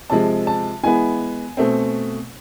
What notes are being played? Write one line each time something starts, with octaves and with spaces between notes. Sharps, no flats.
C3 F3 G#3 A5
A5
E3 G#3 B3 G#5
B2 A3 C4